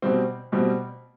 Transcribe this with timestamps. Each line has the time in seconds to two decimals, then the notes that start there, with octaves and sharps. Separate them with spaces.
0.02 B2 G3 C4
0.52 B2 G3 C4